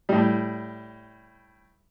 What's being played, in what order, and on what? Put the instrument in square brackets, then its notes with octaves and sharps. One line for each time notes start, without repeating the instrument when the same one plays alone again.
[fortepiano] A2 G3